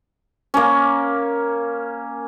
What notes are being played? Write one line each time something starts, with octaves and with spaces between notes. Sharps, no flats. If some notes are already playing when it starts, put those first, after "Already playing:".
A#3 C#4